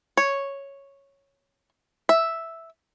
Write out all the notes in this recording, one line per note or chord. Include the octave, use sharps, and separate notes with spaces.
C#5
E5